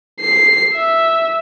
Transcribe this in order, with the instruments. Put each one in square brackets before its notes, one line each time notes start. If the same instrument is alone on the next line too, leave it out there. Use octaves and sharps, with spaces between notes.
[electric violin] C7
E5